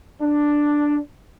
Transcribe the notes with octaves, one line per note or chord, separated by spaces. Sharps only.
D4